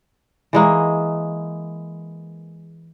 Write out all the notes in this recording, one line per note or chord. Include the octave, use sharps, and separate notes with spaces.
E3 G#3 A#3